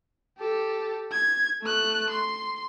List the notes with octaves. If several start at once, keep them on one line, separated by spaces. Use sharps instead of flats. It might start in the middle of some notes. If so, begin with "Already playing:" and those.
G4 A4
G#6
A3 F#6
C6